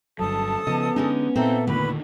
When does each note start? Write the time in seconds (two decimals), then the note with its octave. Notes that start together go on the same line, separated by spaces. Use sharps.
0.19 G1 G2 F#3 A4 A5 D#6
0.67 C#3 F3 B3 D#5
0.96 D3 G#3 C#4 D#4
1.36 A#2 C4 D#4 A4 E5 A#5
1.67 E2 A#2 D3 D#3 A3 B4 B5